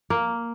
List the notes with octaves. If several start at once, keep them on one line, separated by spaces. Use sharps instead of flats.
A#3